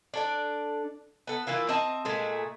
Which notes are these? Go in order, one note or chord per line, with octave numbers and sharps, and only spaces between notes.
D4 A4 D5
B3 A4
E3 A#3 E4 F4
C4 D#5 E5 A5
A#2 G#3 A3